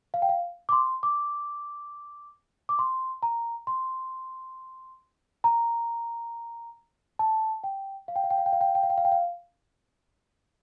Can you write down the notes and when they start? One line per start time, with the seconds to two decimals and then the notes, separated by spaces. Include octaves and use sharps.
0.14 F5
0.22 G5
0.29 F5
0.69 D6
0.72 C6
1.03 D6
2.69 D6
2.79 C6
3.23 A#5
3.67 C6
5.44 A#5
7.19 A5
7.64 G5
8.08 F5
8.16 G5
8.24 F5
8.30 G5
8.38 F5
8.46 G5
8.53 F5
8.61 G5
8.68 F5
8.75 G5
8.83 F5
8.90 G5
8.98 F5
9.05 G5
9.12 F5